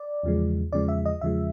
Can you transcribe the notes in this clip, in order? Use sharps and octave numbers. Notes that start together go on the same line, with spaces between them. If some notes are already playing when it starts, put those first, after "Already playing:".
Already playing: D5
E2 C#3 F3 G#3
E2 C#3 F3 G#3 D5
E5
D#5
E2 C#3 F3 G#3 E5